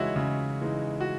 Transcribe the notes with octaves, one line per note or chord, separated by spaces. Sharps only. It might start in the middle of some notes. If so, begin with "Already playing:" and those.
Already playing: C#3 E3 G#3 D#4 E4 F#4 C#5 D#5
C#3
E3 G#3 D#4
F#4